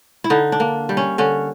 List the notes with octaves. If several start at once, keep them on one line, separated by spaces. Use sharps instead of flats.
E4
D3 D#4
D4
A#3
G3
C#4
D3 C#4